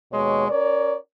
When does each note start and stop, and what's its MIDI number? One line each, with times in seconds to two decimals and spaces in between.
0.12 0.46 39
0.12 0.46 47
0.12 0.46 56
0.12 0.46 73
0.49 0.96 61
0.49 0.96 70
0.49 0.96 73
0.49 0.96 74